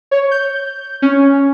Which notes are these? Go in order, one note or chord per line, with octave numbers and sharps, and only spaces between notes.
C#5
G6
C#4